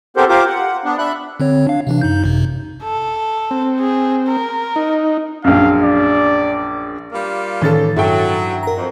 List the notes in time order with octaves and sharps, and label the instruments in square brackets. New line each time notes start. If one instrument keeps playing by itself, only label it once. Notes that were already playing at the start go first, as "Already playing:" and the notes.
[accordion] B3 C4 G4 A4 A#4 C5
F4 G4 A#4 C5 D6
F#5
B3 D4
D4 E5 B5 F#6
[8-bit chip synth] D3 C4 C#5
D4 F5
C3 E3 D4
F#2 D#4 G6
G#1 F#2 C3
[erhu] A4
[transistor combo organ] C4
[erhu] G#4
A#4
[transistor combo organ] D#4
[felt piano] A#1 F#2 [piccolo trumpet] F5
[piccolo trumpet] D5
[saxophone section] G3 A#3 F4
[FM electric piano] A2 D#3 A6 [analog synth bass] E3 [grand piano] C#4 A4
[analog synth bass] G2 [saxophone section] F#3 [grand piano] E4 A4 G5
[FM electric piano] A#4 A#5
[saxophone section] F2